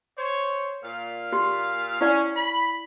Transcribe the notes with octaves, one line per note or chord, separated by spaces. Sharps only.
C5 C#5
A#2 F5
G4 C6
C#4 E4 D5 F#5
B5